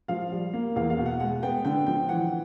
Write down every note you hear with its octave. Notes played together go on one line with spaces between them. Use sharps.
F3 F5
G3
A#3
E2 F5
F5
B2
F#5
G#3 F#5
B3 G5
D3 G5
F3 G5
E3 F#5